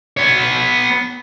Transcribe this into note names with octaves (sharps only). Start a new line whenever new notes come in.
B3 C#5